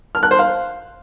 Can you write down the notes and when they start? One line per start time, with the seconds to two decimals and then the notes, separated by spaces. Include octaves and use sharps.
0.15 F6
0.23 F#6
0.31 C5
0.39 F5